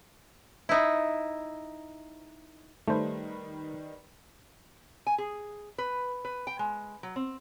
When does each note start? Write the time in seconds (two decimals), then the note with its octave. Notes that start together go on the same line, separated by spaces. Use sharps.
0.69 D#4 E4
2.88 D#3 G3 A3 B4 C5
5.07 G#5
5.18 G#4
5.78 B4
6.25 B4
6.47 G5
6.59 G#3
7.03 F#3
7.16 C4